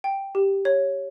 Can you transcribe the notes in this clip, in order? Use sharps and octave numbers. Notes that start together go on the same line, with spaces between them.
G5
G4
C#5